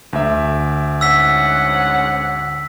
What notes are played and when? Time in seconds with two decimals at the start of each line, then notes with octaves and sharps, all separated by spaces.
0.13 D2 E5
1.01 G#2 C#4 F#5 E6 B6